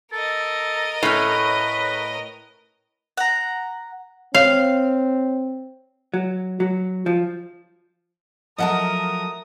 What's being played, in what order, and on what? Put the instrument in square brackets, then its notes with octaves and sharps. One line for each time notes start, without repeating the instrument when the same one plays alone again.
[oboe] A4 [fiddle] A#4 D#5
[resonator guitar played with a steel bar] A2 A3 C#4 [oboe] B4
[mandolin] F#5 A#5
[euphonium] C4 [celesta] C#5 [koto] F5
[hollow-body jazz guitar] F#3
F#3
F3
[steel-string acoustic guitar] F3 F#3 A3 [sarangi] A#4 [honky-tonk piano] D#5 F#5 A5 [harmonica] D#6